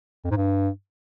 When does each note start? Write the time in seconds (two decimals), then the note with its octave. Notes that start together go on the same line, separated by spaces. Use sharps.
0.25 F2
0.31 G#2
0.37 G2